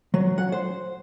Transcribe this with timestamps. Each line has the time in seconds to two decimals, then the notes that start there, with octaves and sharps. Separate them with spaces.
0.14 F#3
0.38 F#5
0.52 C5